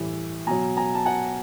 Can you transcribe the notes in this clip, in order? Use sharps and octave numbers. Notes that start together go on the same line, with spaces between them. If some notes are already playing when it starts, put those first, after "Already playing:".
Already playing: A2 E3 G3
B2 F#3 G#5 A#5
G#5 A#5
A5
F#5 G#5